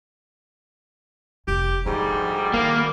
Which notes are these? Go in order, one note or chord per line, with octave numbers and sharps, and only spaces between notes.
F1 G4
D2 G#2 D3 F3 G3
D#3 A#3